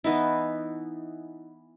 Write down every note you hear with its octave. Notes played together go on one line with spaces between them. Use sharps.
E3 B3 D#4 E4